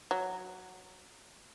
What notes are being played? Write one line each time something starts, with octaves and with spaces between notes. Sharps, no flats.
F#3